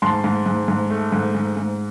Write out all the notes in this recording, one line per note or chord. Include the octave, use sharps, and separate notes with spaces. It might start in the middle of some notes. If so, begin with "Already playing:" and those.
G#2 A5 C6
G#2
G#2
G#2
A3
G#2
G#2
G#2